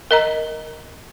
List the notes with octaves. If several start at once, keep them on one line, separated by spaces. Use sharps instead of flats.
A#4 D#5 A#5